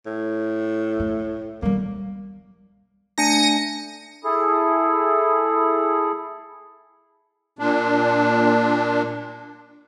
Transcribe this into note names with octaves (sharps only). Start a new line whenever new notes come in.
A2
A3
G3 A#3 B3
A3 D4 G#5 A#6 C#7 D#7
E4 G#4 A4
A#2 D4